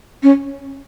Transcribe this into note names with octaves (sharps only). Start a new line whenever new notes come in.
C#4